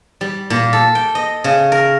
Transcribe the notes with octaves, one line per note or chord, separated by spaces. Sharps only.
G3
A#2
A4
G5
D#5
C#3
A#4